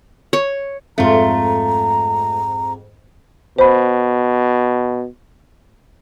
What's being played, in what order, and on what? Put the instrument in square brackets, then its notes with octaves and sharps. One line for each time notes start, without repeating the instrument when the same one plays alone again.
[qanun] C#5
[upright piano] F2 G#2 [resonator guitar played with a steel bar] A3 F4 [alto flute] A#5
[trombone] B2 [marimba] C5 B5